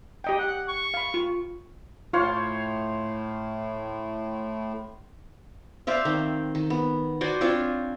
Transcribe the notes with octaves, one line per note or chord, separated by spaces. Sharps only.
G4 D#5 G5
F#5
C#6
F5 B5
F4
A2 F4 C5 C#5 F5
C5 D5 E5 F5
D#3 C4
D#3
B3
F#4 C5 D5 G#5
C4 D4 F4 C#5